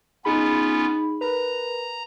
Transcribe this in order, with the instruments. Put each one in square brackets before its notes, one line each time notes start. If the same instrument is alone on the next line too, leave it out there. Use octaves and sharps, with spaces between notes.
[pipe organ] B3 C#4 F4 [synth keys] D#4 G#4 B5
[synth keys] A#4 B4 [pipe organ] A#5